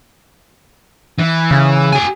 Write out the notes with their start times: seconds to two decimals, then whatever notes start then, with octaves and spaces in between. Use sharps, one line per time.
1.19 E3
1.51 C#3
1.93 G4 G#5